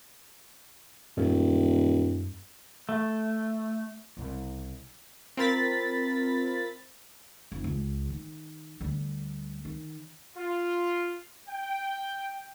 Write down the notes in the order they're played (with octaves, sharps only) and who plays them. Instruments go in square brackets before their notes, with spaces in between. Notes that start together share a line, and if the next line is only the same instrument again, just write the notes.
[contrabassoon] D#1 [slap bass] F#2 A3
[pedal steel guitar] A3
[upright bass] C2 C#3
[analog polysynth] C4 F4 A#4 B5 A6 B6
[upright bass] F1
C#2
D#3
D2 G3
D#3
[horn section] F4
G5